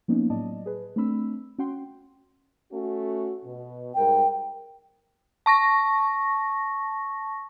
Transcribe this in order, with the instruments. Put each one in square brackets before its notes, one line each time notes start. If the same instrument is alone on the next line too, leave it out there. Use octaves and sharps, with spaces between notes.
[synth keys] F3 A#3 B3 C#4 D#4
A2 F#3 D5 D#5 A5
G#4 B4
A3 C4 D4 B5 E6
C#4 F#4 F#5 G5 C6
[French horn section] A3 C#4 F#4
B2
[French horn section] G#2 G3 A#4 [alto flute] G5
[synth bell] A5 C#6 A#6